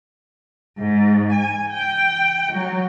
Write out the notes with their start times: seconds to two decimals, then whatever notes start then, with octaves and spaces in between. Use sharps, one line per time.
0.77 G#2
1.33 G#5
1.71 G5
2.51 F#3